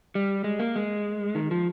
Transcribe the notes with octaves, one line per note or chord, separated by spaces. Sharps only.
G3
G#3
A#3
G#3
D#3
F3